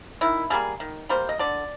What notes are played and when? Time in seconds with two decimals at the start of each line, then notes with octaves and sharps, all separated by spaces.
0.21 D#3 E4
0.50 G3 A#3 G#4
0.80 D#3
1.09 G3 A#3 C5
1.29 D#5
1.39 D3 D5